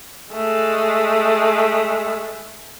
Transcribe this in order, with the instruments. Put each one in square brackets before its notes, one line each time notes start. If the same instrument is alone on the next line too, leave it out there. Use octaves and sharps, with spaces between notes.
[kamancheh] G#3 A3